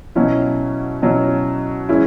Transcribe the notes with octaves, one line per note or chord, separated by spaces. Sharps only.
B2 F#3 C#4 E4
B2 F#3 C#4 E4
E3 G#3 C#4 E4